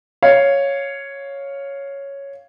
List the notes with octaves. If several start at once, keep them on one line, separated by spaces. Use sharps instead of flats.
C#5 F5